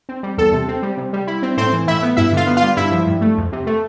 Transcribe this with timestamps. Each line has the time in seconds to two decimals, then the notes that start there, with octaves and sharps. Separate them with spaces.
0.09 C4
0.23 G3
0.38 E2 A4
0.53 C3
0.68 C4
0.82 G3
0.97 C3
1.13 G3
1.27 E4
1.42 C4
1.57 A2 C4 C5
1.73 E3
1.87 A2 E4 E5
2.03 B3
2.17 G2 E4 E5
2.33 D3 F4 F5
2.47 B3
2.57 F4 F5
2.63 G3
2.77 G2 E4 E5
2.92 F3
3.07 G2
3.21 A3
3.37 F2
3.52 C3
3.66 A3